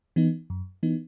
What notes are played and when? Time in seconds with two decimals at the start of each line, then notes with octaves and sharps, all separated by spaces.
0.16 E3 B3 D#4
0.50 F#2
0.83 E3 B3 D#4